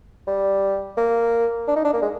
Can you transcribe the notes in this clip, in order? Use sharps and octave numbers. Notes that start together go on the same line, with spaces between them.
G3
A#3
D4
D#4
D4
A#3
G#3